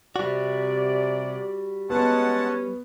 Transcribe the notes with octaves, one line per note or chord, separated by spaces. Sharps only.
C3 G3 F#4 D5
G#3 B3 C#4 F#5 A5